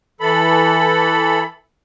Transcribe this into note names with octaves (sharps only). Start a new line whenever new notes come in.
E3 A4 B5